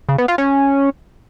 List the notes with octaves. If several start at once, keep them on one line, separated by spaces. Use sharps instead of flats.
C#3
B3
F4
C#4